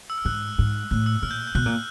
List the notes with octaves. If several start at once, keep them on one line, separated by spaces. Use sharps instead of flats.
E6
F6
G#2 F#6
G#2
A2 F#6
E6
A#2 F6
G6
G6
B2 F#6
A#2